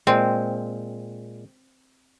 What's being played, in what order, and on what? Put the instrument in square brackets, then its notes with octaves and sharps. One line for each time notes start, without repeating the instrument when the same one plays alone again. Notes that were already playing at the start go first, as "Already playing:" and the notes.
[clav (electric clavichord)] A#2 G#3 [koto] C4